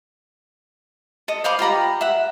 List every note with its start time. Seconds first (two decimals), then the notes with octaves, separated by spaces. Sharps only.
1.28 A4 D#5
1.44 C5 F5 B5 D6
1.59 F4 G4 A#5 B5
2.01 E5 F#5